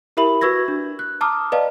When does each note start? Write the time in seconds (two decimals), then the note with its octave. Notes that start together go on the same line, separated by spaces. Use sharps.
0.17 E4 G4 A#4 E5 B5 F#7
0.41 F#4 B4 C#6 E6 G#6 A#6
0.68 D4
0.99 F#6
1.21 A5 A#5 D6 D#6 F6
1.52 B4 D5 D#5 F5 A5